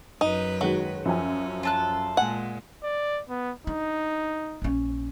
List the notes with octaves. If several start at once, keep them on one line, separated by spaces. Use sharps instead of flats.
F#2 D#4 B4
D#3 F#3 G#3 F#4
F#2 F3 C#4 G#5
F4 A4 F#6
A#2 G#3 F#5 G#5
D5
B3
D4 D#4
A#1 C#4